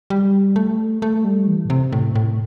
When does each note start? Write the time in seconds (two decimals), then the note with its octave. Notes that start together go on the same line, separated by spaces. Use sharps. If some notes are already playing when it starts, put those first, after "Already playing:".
0.10 G3
0.56 A3
1.02 A3
1.25 G3
1.48 E3
1.65 A2
1.70 C3
1.92 A2
2.15 A2